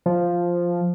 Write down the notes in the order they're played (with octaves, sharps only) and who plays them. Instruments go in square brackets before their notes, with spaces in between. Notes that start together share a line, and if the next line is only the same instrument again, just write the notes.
[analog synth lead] F3